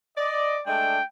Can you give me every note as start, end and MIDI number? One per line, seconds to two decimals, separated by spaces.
0.18 0.62 74
0.18 0.57 75
0.67 0.99 56
0.67 0.99 57
0.67 0.99 62
0.67 1.05 79